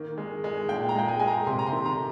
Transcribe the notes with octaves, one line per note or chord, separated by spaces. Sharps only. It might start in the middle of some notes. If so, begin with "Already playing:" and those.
Already playing: D#3 A#3
G#3
G#3
A#2 G5
A#5
G#3 G5
G#5
G#3 G#5
A#5
C3 C6
A#5
C6
D#3
A#5